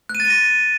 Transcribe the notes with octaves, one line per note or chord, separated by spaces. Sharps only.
F#6
D#7
A6
D#7
A#6